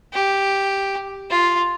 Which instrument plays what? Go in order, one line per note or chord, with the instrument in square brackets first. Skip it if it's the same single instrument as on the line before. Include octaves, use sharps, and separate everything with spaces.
[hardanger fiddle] G4
F4